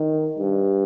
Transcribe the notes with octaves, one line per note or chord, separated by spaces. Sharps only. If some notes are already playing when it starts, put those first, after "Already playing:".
Already playing: D#3
G2